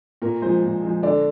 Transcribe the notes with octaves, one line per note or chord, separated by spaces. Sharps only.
A#2 A#4
F3 G#3 C5
A#2
F3 G#3
D3 D4 D5